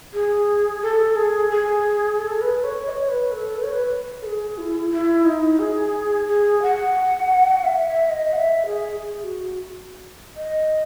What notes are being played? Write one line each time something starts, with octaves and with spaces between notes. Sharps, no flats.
G#4
A4
G#4
G#4
A4
B4
C#5
D#5
C#5
B4
A4
B4
C#5
B4
A4
G#4
E4
E4
D#4
G#4
G#4
F#5
E5
E5
D#5
F#5
E5
G#4
G#4
F#4
D#5